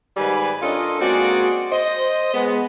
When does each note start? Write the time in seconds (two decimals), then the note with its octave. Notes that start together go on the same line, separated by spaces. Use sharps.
0.17 G#2 D#3 G3 G4 B4 G#5
0.61 C#4 D4 F4 A4 A#4 D#5
1.01 G#3 A#3 C4 F#4 G#4 D5
1.71 C5 D#5
2.33 G#3 B3